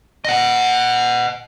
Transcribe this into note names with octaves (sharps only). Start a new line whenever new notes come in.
D#5 F#5